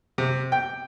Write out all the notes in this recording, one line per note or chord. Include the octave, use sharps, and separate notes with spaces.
C3
G5